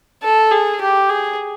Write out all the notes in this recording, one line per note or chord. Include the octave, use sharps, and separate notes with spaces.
A4
G#4
G4
G#4